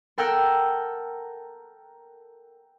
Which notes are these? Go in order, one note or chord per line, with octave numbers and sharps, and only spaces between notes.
A4 A#4 F#5 G5 E6 G6